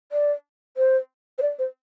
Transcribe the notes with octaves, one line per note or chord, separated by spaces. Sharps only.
D5
C5
C5
D5
C5